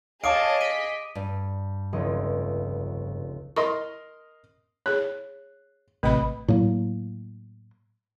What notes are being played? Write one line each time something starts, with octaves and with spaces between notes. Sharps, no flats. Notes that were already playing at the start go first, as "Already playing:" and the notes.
G#4 C#5 D#5 F5 A5 D6 D#6 D7
B6 D#7
G2
F1 C#2 D#5
A#4 D#5 C6 C#6
G#4 C#5 F#6
A1 C3 A3 B4 D#5 B5
A2 F#3 A#3